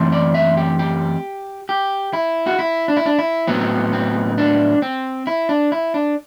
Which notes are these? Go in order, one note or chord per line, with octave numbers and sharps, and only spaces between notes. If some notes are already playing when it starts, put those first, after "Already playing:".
Already playing: F#2 E3 A3 C4
D5
E5
G4
G4
G4
E4
F#4
E4
D4
E4
D4
E4
A2 F#3 B3 C4
C4
D4
C4
E4
D4
E4
D4